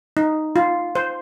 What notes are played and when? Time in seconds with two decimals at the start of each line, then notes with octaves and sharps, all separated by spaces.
0.17 D#4
0.56 F4
0.95 C5